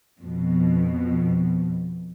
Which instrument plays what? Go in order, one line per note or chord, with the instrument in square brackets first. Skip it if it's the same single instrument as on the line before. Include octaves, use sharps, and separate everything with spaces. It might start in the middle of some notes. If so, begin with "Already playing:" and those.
[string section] F2 B2